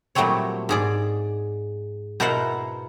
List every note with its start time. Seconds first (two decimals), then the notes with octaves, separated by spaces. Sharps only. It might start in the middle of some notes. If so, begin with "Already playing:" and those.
0.15 A#2 F#3 G3 A3 C4 C#5
0.69 G#2 G#4 D5
2.20 B2 E4 A#4 C5 F5 F#5